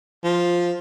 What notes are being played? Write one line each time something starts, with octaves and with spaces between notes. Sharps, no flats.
F3